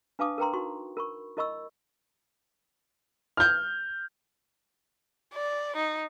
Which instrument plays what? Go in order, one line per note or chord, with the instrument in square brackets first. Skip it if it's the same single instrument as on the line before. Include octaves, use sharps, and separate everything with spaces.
[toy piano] D4 B4 F5 A5 D6 D#6
A#4 B4 G5 A#5 C6
D#4 F#4 C6 C#6
A#4 B5 C#6
E4 A#4 D#5 B5 C#6 E6
[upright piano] F6 G6
[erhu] D5
D#4